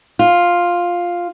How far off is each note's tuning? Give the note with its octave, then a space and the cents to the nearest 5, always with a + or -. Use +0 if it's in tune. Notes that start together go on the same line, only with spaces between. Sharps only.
F4 +5